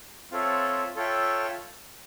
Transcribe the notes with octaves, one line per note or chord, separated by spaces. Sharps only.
C4 F4 A4 C#5 E5
F4 A4 C#5 E5 G5